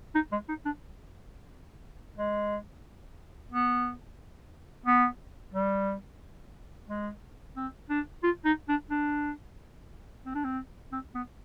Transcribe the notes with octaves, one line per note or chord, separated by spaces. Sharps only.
D#4
G#3
D#4
D4
G#3
B3
B3
G3
G#3
C4
D4
F4
D#4
D4
D4
C4
D4
C4
C4
B3